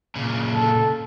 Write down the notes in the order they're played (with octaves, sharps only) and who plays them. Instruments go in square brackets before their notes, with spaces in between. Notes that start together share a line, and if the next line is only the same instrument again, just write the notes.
[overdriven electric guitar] A#2 C#3
[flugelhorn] A4